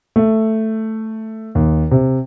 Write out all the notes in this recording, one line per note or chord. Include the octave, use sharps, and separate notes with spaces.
A3
D#2
C3